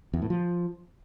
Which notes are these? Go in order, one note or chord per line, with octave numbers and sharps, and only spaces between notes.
E2
A2
F3